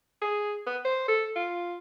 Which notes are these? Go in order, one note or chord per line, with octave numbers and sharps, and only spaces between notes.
G#4
B3
C5
A4
F4